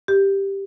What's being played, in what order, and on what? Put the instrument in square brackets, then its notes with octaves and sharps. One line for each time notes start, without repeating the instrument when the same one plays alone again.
[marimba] G4